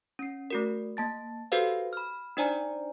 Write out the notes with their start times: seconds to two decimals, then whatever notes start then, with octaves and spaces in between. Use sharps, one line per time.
0.19 C#4 C7
0.50 A3 F#4 A#4
0.97 A#3 A5 A6
1.52 F#4 G4 A4 B4 C5 F5
1.93 B5 F6
2.37 D4 D#4 C5 D5 G#5 A#5